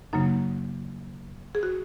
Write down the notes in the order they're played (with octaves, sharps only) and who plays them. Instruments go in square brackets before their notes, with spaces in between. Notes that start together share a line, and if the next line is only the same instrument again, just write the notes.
[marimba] F#2 C#3 F#3 A#3 D#4
G#4
F#4